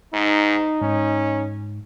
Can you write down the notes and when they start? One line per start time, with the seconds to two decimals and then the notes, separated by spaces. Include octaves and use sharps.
0.14 G#2 D#4
0.82 G#2 C#4